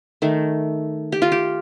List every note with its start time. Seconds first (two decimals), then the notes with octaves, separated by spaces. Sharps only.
0.22 D#3 A3
1.12 G4
1.22 F4
1.32 G4